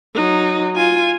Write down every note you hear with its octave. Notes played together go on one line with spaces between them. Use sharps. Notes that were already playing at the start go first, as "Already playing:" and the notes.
F#3 D#4
F4 G#5